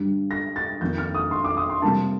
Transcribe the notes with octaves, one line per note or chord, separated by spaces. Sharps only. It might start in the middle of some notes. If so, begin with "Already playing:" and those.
Already playing: G2 D3 G3
A#6
A6
F2 D#3 A#3 G6
F6
D#6
C6
D6
D#6
C6
C3 G3 A#3 A5